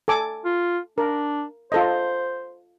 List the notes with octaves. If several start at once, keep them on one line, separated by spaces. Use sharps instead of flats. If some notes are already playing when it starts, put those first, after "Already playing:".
A4 G#5 D6
F4
D4 A#4
F4 A4 C5 D#5